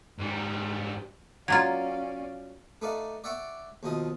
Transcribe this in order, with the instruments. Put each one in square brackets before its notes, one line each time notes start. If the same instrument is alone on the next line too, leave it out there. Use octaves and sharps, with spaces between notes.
[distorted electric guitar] G#2 G3
[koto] F#3 A#3 F4 [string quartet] C#4 D5 F5 [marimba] G#6
[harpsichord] A3 D#4 B4 D5 F5
D5 E5 F#5 G5 C#6 D6
D#2 B2 F3 D#5